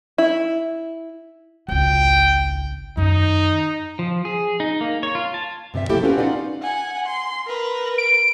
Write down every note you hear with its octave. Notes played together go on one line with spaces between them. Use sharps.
E4
G#1 C#2 G5
F#2 D#3 D#4
F3
G#4
D#4
A#3
C#5
F4
A5
G2 C3 G3 E5
F3 A3 A#3 E4 G4 A4
C4 C#4 F4 F#4 A#4 B4
C#4 D#4 F4 D5 F#5
F#5 G#5
C6
A#4 B4
D7